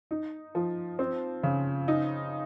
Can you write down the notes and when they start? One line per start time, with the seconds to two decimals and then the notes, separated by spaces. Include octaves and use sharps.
0.11 D#4
0.55 F3
0.99 C4
1.43 C#3
1.88 D#4